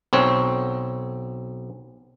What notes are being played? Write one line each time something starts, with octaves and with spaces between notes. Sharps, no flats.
B1 C4 C#5